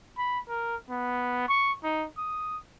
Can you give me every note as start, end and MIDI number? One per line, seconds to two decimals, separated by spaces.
0.18 0.40 83
0.49 0.76 70
0.90 1.45 59
1.48 1.73 85
1.83 2.06 63
2.18 2.58 87